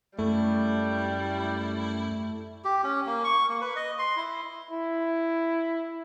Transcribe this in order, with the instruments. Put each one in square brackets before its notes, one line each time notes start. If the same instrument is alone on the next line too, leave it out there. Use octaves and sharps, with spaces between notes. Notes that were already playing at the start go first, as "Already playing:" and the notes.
[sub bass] F#2 [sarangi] G3 [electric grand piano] A3 [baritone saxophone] E4
[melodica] G4
C#4
A#3
C#6
A#3
B4
D#5
C6
E4
[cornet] E4